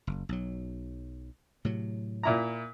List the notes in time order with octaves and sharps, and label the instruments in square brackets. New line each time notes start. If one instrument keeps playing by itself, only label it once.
[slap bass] F#1
B1 F#3
A2 C3 F#3
[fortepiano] A#2 E4 A#5